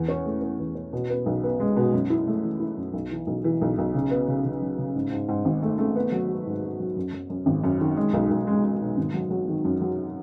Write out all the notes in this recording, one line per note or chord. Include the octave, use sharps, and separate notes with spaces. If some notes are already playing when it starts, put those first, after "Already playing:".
Already playing: E2
C#4
A3
C#4
E2
C#4
B2
B3
B1
B3
G#3
B2
F#2
E4
A3
E3
E4
F#2
B1
E3
B1
E3
B1
B1
C#3
B3
C#3
C#3
F#3
C#3
G#2
G#2
G#2
G#1
A3
A3
B3
F#3
F#4
G#2
F#4
F#3
F#2
F#2
F#2
G#1
F#2
D#3
G#3
B1
B1
G#3
G#3
B2
G#1
F#3
F#3
D#3
F#2
F#3